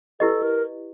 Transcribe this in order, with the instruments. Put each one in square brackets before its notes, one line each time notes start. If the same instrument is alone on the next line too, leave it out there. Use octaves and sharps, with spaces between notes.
[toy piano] E4 G4 B4 D#5 [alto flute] A4
[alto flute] A#4